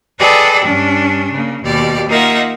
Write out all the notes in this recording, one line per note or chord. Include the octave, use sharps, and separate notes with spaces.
G#4 A4 B4 D5 D#5 G5
G2 C#4 D4
C#3 A#3
D#2 B2 G4 D5
A#3 D#4 F4 A#4 E5 F#5